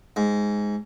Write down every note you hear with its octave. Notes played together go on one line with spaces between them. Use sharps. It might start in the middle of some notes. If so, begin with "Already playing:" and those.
G#2